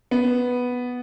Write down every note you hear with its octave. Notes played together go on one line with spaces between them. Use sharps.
B3